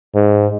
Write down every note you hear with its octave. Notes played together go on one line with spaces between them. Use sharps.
G#2